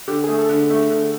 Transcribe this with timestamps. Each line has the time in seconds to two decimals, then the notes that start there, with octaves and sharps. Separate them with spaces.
0.07 D3 G4
0.24 G#4
0.28 A3
0.39 A4
0.49 D3
0.70 A3
0.90 D3